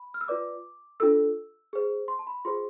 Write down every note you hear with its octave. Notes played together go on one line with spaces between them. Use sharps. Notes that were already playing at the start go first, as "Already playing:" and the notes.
Already playing: B5
F6
E6
F4 B4 D5 D6
D4 F4 A4 E6
G#4 C5
C6
A5
B5
F4 G#4 C5 C6